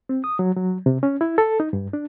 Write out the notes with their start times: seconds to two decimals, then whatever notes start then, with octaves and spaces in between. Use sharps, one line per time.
0.09 C4
0.24 D#6
0.39 F#3
0.56 F#3
0.86 C3
1.03 C#4
1.21 E4
1.38 A4
1.60 D#4
1.73 G2
1.93 D4